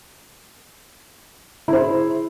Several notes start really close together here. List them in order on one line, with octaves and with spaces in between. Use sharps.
E4 C5 G#4